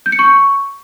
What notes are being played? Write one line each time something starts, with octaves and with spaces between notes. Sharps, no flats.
G6
C#7
C#6